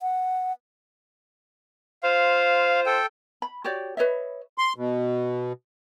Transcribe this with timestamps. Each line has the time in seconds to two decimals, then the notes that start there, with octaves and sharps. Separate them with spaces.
0.01 F#5
2.03 F4 C5 F5
2.86 A4 G5
3.42 B5
3.64 F#4 G4 C#5 D5
3.97 B4 C#5 D#5 E5
4.58 C6
4.76 B2